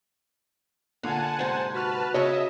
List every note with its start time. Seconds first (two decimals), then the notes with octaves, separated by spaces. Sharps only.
1.03 A#2 D3 F5 F#5 G#5 A5
1.39 G#2 C3 C5
1.74 F#4 B4 A5 F6
2.14 C#3 F#4 A#4 C#5 D#5 E5 A5